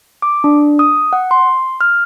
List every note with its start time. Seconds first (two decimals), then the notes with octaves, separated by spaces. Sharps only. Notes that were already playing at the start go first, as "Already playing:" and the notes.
0.22 D6
0.44 D4
0.79 D#6
1.13 F#5
1.31 C6
1.81 F6